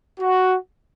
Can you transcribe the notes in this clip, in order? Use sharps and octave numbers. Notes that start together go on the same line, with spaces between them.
F#4